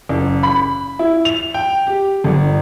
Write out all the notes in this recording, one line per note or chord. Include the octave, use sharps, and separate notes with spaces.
F#1
B5
E4
F7
G5
G4
G1